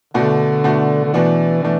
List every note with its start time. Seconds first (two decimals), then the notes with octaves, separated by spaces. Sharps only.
0.14 B2 D3 A3 D4 F#4
0.64 B2 A3 D4 F#4
1.04 D3
1.13 B2 E3 A3 D4 F#4
1.63 B2 E3 A3 D4